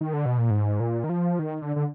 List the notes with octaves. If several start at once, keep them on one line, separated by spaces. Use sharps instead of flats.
D#3
D3
B2
A#2
G#2
A#2
D#3
F3
D#3
D3
D3